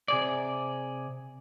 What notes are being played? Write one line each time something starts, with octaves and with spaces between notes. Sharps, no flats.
C3 G#4 D5